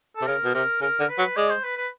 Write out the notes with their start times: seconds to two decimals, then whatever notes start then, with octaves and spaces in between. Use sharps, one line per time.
0.16 A4
0.22 C3
0.27 C#3 A#4
0.44 B2
0.54 C3 A#4
0.81 C#3 A#4
1.00 D3 A#4
1.09 B4
1.18 F#3
1.37 G#3 D5
1.50 C5
1.64 B4
1.77 B4